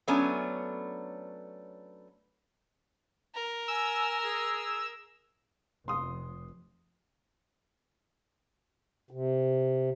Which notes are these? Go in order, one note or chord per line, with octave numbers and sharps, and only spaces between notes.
F#3 A3 B3 C#4 D4
A#4
G#5 E6
G#4
F1 C6 D#6
C3